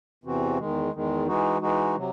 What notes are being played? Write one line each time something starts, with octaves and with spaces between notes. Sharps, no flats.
E2 C3 E3 C4 F#4
E2 D#3 G#3
E2 D#3 G#3
E3 G#3 D#4 F#4
E3 G#3 D#4 F#4
C3 F#3